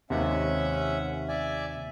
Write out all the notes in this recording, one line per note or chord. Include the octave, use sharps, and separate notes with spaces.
D#2 C3 C#4 E5 F#5
D5 E5 G#5